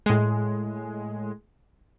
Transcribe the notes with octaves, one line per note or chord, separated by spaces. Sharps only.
A2 G#3